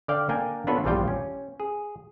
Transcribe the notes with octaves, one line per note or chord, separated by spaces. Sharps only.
D3 D5 F5 G5
A#3 D4 A#4 G5 G#5
B3 D4 F4 A4 B4 C#5
A#1 E2 G2 G3 F4 G5
C#4
G#4